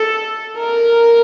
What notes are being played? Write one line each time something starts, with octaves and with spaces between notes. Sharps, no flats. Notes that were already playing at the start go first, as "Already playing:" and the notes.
Already playing: A4
A#4